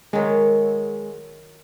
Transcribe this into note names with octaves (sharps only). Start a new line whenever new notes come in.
D#3 F#3 G#3